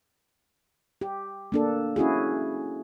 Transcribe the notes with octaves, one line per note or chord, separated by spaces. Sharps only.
G4
A#3 D4 A4
C#4 E4 F#4 G#4